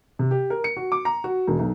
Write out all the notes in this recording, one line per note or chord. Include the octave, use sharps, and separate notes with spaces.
C3
G4
A#4
C#7
F#4
D6
A#5
F#4
E1
B1